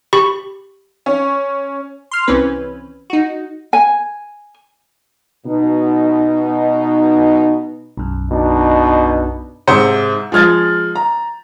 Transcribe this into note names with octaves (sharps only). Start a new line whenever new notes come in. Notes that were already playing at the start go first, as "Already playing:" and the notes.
G4 B5 C#6
C#4
C6 F6
C2 E3 C4 C#4 B4
D#4 F#4
G#5
B2 D#4
B1 F#2
B2 D4 D#4
G#2 C3 C5 C#7
F3 G#3 F6 G#6 A6
A#5